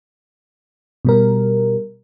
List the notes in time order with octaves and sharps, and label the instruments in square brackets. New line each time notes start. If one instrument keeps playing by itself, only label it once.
[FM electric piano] B2 G3 A#4